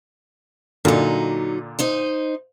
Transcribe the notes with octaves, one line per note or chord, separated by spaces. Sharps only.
A#2 D3 F#3 D#4
D#4 C5 D#5